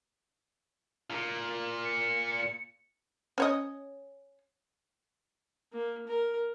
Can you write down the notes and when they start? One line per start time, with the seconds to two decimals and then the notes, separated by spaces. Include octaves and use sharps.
1.10 A#2
1.85 C#7
3.38 C#4 C#5 D#5
5.72 A#3
6.07 A#4